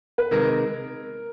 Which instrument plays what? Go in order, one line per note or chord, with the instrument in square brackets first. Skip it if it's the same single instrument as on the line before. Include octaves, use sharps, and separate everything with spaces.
[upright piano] B4
[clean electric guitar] C3 D#3 G#3 [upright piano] A#4